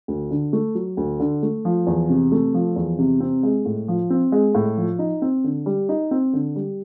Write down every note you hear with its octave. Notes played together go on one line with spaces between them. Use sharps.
D2
D3
A3
F#3
D2
D3
A3
F3
E2
C3
A3
F3
E2
C3
C4
G#3
A2
F3
C4
G#3
A2
F3
D#4
C4
D3
G3
D#4
C4
D3
G3